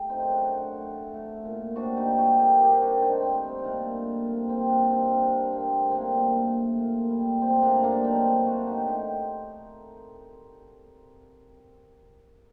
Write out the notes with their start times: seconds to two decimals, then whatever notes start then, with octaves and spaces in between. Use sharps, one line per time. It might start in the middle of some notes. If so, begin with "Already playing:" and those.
Already playing: A3 G4 A4
0.09 C4 D#4
0.20 F#2
0.30 D4 F#4
0.50 A2
0.81 A3
1.14 A3
1.45 A#2
1.76 C3 D4 F#4
1.97 D#4 G4
2.08 G3
2.18 F#4 A4
2.38 G3 G4 A#4
2.60 G4 A#4
2.70 C3
2.81 D4 F#4
3.01 A2 C4 D#4
3.22 C4
3.33 G3
3.44 C4
3.59 D#4
3.64 A3 A#3 D4
3.96 A#2
4.27 C3 A#3
4.49 C4
4.58 G3
4.69 A#3 D4
4.90 C3 C4 D#4
5.11 A#3 D4
5.22 G3
5.32 A#3 D4
5.53 A3 C4
5.85 F#2
5.91 A#3 C4 D4
6.15 A#2 A#3
6.47 A3
6.79 A#2
7.10 G3
7.41 A3 C4
7.62 A#3 D4
7.73 G2
7.83 A#3 D4
8.04 F#3 C4 D#4
8.36 G2
8.46 D4 F#4
8.67 A2 D#4 G4
8.88 D#4 G4